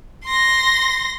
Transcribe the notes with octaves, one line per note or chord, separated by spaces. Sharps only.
C6 A#6